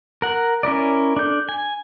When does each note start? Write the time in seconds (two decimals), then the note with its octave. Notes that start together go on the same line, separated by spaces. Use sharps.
0.22 A#4 F#5
0.63 C#4 E4 A#4 D5
1.16 D4 A4 G6
1.49 G#5